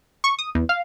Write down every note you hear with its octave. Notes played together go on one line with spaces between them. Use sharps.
C#6
D#6
E2
F5